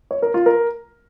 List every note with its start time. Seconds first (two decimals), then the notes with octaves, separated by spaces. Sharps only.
0.11 C#5
0.22 A#4
0.34 F4
0.46 A#4